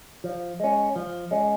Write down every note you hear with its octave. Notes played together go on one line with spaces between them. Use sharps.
F3
G#3 C#4
F3
G#3 C#4